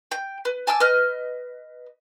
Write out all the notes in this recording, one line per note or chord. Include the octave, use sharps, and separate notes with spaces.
G5
B4
G#5 A5 D6 E6
B4 D#5 F6